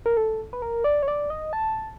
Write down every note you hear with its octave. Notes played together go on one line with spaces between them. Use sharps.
A#4
A4
B4
A#4
D5
C#5
D5
D#5
A5